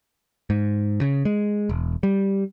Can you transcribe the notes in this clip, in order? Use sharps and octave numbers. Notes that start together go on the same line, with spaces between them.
G#2
C#3
G#3
E1
G3